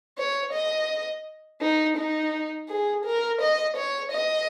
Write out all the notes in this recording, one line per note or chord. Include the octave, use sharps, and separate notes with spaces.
C#5
D#5
D#4
D#4
G#4
A#4
D#5
C#5
D#5